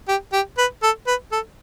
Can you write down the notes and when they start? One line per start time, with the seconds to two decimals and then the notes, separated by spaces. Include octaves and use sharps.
0.08 G4
0.33 G4
0.58 B4
0.83 A4
1.07 B4
1.32 A4